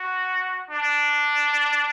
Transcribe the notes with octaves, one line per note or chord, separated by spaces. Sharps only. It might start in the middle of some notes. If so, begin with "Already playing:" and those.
Already playing: F#4
D4